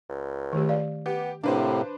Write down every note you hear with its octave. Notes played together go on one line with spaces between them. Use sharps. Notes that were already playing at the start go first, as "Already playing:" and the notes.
C#2
D#3 A3 G4
D5 F5
B3 G4
A2 C3 A#3 D4 B4 C5